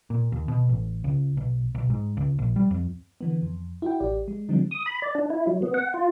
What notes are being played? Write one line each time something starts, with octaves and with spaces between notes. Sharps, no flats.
A#2
D#2
B2
A1
C#2
B1
B1
G#2
C#2
A#1
G3
F2
D3 E3 B3
F2
E4 F#4 G5
A1 G4 D5
G#3
D3 F3 G3 G#3 C4 D4
D#6
B5
D5
D4
E4
F#3
B3
F#5
F4